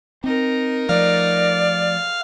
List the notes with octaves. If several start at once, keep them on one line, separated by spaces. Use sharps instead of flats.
C4 D#4 A#4
F3 A3 D5 F5